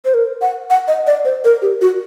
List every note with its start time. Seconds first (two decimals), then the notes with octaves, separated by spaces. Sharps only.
0.05 C5
0.14 A#4
0.42 F#5
0.70 F#5
0.88 D#5
1.07 D5
1.25 C5
1.45 A#4
1.62 G4
1.81 F#4